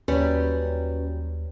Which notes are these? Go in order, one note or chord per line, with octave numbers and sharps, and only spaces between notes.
D#2 F#3 G3 C#4 B4